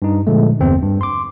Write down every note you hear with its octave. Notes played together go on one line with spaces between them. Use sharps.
G2 D#4
A#2 D3 F3 G#3 A3
G1 E2 C4
G2
C6 D6